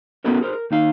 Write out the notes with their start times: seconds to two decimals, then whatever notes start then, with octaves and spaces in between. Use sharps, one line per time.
0.24 B3 C#4 E4 F#4 A4 A#4
0.41 G#4 A#4 C5
0.53 A#4
0.71 D#2 D#4 F5